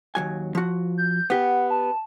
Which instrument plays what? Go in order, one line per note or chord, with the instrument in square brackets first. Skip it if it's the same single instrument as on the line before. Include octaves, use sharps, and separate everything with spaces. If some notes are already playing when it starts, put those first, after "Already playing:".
[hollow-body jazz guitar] D#2 F#3 G#5
F3 F#4
[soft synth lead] G6
[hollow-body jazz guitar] B3 G4 [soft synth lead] F#5
[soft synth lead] A5